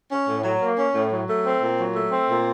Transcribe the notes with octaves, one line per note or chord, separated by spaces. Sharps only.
C#4
A2
F#3
A#3
C#4
A2
F#3
A3
C4
A#2
F#3
A3
C4
A#2